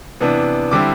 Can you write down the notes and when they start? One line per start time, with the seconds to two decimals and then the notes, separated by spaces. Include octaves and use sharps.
0.20 C3 E3 B3 D4
0.71 D3 G3 C4 E4 D6